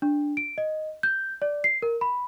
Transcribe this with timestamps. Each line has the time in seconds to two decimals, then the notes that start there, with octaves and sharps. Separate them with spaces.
0.02 D4
0.37 D7
0.58 D#5
1.03 G6
1.42 D5
1.64 C7
1.82 A#4
2.01 B5